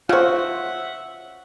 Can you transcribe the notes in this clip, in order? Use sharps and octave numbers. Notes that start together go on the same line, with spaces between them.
C#3 F4 F#4 C5 E5 F#5